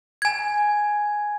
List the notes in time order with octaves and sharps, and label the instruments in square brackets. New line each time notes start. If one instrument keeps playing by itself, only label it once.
[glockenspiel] G#5 G#6